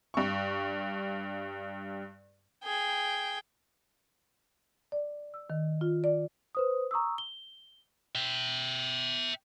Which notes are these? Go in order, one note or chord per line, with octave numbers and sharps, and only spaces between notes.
G2 C#6
G#4 G5
D5
E6
D#3
F4
D5
B4 C5 D#6
A#5 C#6 D#6 E6
G7
E5 G5